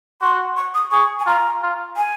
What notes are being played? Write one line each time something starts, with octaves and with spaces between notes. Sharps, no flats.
F#4 C6
C#6
D#6
G#4 C#6
G#5
F4 A#5
F4
G#5